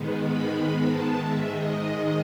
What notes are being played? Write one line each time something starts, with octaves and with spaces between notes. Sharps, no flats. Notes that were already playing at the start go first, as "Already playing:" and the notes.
Already playing: G#2 D#3 G#3 B3
B5
A5
G#2 D#3 G#3 E5
D#5